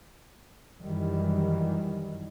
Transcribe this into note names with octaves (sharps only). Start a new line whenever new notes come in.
F#2 D#3 E3 G3